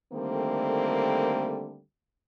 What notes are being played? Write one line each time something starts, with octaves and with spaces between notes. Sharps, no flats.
D3 D#3 G3 A3 A#3 C4